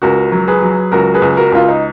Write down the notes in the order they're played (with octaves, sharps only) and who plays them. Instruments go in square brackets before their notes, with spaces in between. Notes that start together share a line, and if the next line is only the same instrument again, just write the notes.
[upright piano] C#2 F#4 A#4
F#3
G#4 B4
F#3
C#2 F#4 A#4
G#4 B4
C#2
F#4 A#4
C#2 F4
D#4